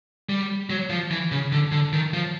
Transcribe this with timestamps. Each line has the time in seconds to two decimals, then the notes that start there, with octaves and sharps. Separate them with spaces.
0.29 G3
0.70 F#3
0.90 F3
1.11 E3
1.32 C#3
1.52 D3
1.72 D3
1.93 D#3
2.14 F3